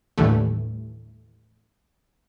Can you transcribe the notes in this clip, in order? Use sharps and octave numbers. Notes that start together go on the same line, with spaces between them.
D#2 A2 D3 E3 G3 A3